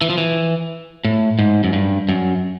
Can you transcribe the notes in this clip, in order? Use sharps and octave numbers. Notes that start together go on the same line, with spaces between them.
E3
F3
E3
A2
G#2
F#2
G2
F#2